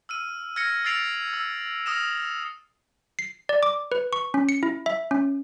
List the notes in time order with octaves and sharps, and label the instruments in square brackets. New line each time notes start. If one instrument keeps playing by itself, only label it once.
[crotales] E6 F6 D#7
F6 G#6 A#6 C#7
E6 F6 A6 C7 D7 F7
E6
D#6 F6 A#6 E7
[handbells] C7
D5
D6
B4
C#6
C#4
C#7
E4
E5
C#4